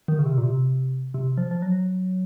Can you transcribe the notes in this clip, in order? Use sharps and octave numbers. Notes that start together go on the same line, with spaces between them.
D#3
C#3
C3
A#2
C3
C3
F3
F3
F#3